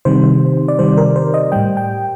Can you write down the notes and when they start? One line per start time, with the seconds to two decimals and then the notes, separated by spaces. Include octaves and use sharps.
0.05 C3 D#3 G3 C5
0.68 D5
0.79 C3 D#3 G3 C5
0.97 A#4
1.16 C5
1.34 D#5
1.52 A2 G3 G5
1.77 G5